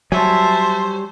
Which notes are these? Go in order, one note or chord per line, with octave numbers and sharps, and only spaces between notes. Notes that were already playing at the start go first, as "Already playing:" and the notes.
F#3 G3 C5 C#5 E5 G#5 A5